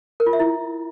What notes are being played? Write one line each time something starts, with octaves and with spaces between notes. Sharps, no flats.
A#4
F4
E5
E4